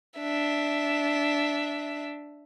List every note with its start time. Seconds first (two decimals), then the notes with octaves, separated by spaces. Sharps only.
0.19 D4 E5